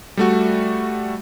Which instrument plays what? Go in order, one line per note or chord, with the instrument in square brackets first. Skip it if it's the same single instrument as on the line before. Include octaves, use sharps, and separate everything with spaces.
[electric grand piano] G3 A3 F#4